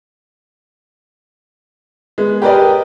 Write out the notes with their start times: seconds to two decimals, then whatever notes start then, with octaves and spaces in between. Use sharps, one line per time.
2.18 G#3 B3
2.42 G4 A#4 B4 D5 D#5